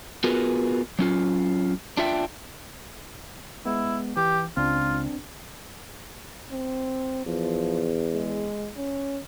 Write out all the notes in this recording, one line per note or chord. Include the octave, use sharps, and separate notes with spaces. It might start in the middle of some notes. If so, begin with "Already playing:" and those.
B3 F4 F#4 G#4 A#4 B4
F#3 C#4 F4
D4 F4 E5 G5
G#3 B3 E4
E3 G4
C#2 C4 D4 F4
C4
E2 F3
G#3
C#4